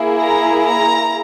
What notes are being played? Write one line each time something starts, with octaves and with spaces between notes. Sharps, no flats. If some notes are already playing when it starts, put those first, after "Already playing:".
Already playing: A#3 E4 G#4
A#5
A#5